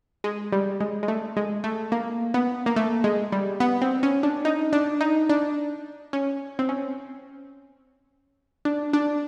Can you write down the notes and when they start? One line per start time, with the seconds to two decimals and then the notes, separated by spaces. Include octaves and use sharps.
0.24 G#3
0.52 G3
0.80 G#3
1.03 G#3
1.08 A3
1.37 G#3
1.64 A3
1.92 A#3
2.34 B3
2.66 A#3
2.76 A3
3.04 G#3
3.32 G3
3.60 B3
3.82 C4
4.03 C#4
4.23 D4
4.45 D#4
4.73 D4
5.01 D#4
5.30 D4
6.13 C#4
6.59 C4
6.69 C#4
8.65 D4
8.93 D4